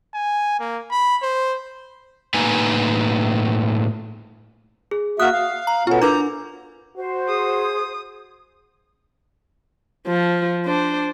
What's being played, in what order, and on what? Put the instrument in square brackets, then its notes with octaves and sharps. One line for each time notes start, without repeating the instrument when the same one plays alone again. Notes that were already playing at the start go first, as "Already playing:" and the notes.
[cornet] G#5
A#3
B5
C5
[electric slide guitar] A2 A#3 D#4 B4 G#5 A#5
[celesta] G#4
[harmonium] A#3 F#4 E5 [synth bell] D#6 [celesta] F6 F#6
[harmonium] F5
[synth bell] A#5
[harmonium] B2 B3 C#4 [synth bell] F4 A4 [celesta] F6
[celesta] D4 E4 A#4 [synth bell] B4 D6 G6 [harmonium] A#5
[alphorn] F#4 [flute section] C5
[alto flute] G#4 [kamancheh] D#6
[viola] F3
D4 C5